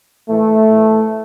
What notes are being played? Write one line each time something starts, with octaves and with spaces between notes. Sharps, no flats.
A2 E3 A3
A2 E3